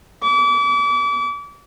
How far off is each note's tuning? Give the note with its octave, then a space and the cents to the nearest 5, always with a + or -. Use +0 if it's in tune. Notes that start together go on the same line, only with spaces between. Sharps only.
D6 -35